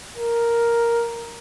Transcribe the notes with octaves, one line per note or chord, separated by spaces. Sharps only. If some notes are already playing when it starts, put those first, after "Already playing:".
A#4